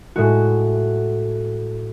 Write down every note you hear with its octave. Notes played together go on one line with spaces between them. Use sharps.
A2 G#3 F#4